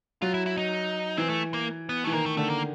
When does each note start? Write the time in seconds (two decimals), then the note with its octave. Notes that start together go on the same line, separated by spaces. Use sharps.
0.22 F#3 F4
0.34 E4
0.46 E4
0.57 D#4
1.17 E3 C4
1.29 A3
1.54 A#3
1.89 B3
2.04 E3 A3
2.13 D#3 A#3
2.26 A3
2.37 D3 A3
2.50 A#3